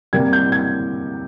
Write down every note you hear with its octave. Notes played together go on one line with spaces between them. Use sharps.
C3 G3 A#3 G#6
G6
G#6